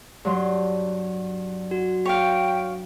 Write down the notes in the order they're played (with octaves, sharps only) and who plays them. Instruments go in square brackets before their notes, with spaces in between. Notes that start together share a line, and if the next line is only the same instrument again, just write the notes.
[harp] G2 F#3 C6
[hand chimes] F#4
[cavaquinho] C#5 F5 [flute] G5